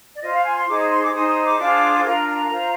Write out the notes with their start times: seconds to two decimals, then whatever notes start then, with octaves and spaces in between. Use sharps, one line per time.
0.15 D5
0.22 F4 C5 D#5
0.34 F5
0.45 G#5
0.56 C6
0.67 D#4 G#4 C5 D6
0.79 D#6
0.91 C6
1.02 D6
1.13 D#4 G#4 C5 D#6
1.29 D#6
1.44 D6
1.59 D4 F4 G#4 C5
2.05 D4 F4 A#4 A#5
2.28 A#5
2.51 F4 C5